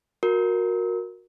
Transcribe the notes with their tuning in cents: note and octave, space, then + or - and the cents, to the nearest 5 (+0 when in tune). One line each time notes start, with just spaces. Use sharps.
F#4 -20 A#4 +0